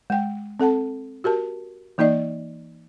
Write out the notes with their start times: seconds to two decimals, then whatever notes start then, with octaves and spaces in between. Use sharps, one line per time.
0.10 G#3 G5
0.60 C4 A4 F#5 A5
1.24 F#4 G4 A#4 A5
1.98 E3 A#3 D#4 D5 D#5